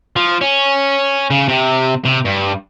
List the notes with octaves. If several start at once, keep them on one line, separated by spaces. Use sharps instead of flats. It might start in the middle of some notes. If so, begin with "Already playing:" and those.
F3
C#4
C#3
C3
C3
G2